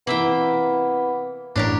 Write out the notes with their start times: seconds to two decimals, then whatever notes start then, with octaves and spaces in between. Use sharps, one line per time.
0.07 C3 E3 A#3 B3 E5 G5
1.56 A1 D4 G4 A#4 C#5 F6